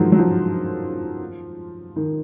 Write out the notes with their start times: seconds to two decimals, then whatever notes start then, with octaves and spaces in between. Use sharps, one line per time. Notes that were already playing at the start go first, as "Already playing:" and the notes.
Already playing: D#3 F3 F#3 G#3
0.12 F#3
0.18 F3
1.96 D#3